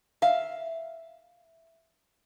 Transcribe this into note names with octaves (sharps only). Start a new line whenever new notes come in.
E5 F5